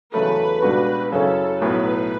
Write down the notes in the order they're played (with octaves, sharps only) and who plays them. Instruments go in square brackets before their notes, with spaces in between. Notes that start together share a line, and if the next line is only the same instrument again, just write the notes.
[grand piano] E2 C#3 F#3 A3 [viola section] B4
[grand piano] C#2 B2 G3 D4 F#4
[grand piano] F#2 C#3 F#3 C#4 E4 [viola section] A4
[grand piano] B1 A2 F#3 B3 [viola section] B4